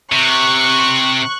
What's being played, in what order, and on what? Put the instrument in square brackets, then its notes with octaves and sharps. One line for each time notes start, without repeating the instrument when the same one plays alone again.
[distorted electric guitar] C3 [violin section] C#6 F#6